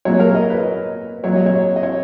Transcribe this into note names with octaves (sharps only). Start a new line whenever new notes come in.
A#2 F#3 C#5
A#4
D#5
B4
A#2 F#3 C#5
D#5
C#5
D#5
C#5